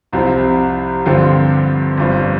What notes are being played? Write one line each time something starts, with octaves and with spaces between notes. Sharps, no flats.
C2 C3 F3 C4
G2 D3 F3 C4 F4
G1 G2 F3